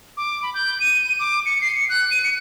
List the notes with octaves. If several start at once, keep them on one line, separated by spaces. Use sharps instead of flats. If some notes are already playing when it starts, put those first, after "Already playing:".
D6
B5
G6
D#7
D#7
D6
C#7
C7
C#7
F#6
D#7
C#7